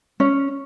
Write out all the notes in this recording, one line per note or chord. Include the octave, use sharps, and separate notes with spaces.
C#4